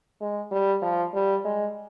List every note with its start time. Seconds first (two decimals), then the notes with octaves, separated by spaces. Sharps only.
0.21 G#3
0.52 G3
0.82 F3
1.14 G3
1.45 G#3